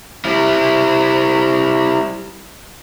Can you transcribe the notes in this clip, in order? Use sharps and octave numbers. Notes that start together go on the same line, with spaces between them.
G3 E4